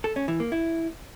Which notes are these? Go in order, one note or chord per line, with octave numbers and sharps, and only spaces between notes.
A4
C#4
E3
A#3
E4